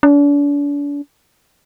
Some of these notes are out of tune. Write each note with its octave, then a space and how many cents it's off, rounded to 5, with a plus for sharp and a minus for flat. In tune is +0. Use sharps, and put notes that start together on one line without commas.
D4 -40